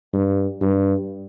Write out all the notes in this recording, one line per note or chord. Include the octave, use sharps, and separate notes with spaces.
G2
G2